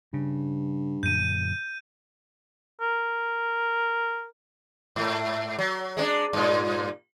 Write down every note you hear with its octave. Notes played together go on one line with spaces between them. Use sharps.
G2 C#3
F#2 A#2 D3 G6 D#7
A#4
G#2 A3
F#3
G#3 C4 D4
G2 A#2